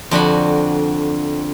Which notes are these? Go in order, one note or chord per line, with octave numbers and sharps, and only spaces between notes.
F2 D3 F#4 B5